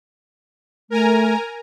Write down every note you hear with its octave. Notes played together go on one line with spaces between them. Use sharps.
A3 A#4 G#5 A#5